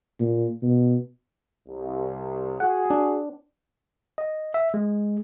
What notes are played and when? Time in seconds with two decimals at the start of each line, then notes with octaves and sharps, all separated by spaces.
0.20 A#2
0.62 B2
1.68 C2
2.60 F#4 G#4 F#5
2.90 D4
4.18 D#5
4.54 E5
4.74 G#3